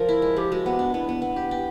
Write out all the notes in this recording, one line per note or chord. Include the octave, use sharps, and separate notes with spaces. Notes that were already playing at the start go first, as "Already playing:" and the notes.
Already playing: F3 A#4
E4
G#3
F3 G4
G#3 F#4
B3
D4
B3 E4
B3
B3
G4
G4